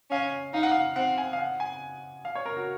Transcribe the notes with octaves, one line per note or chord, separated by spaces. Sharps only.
C#4 F5
D#4 F5
F#5
F5
C4 F#5
G#5
F5
F#5
G#5
F5
C#5
A#4
F#4